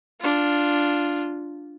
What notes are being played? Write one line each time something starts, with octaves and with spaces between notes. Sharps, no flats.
D4 F4